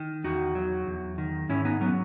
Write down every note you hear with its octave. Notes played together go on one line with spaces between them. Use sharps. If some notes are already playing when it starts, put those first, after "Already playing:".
Already playing: D#3
E2 D#4 F#4
F#3
E2
D#3
G#2 C#4 E4
B3 D#4
F#3 B3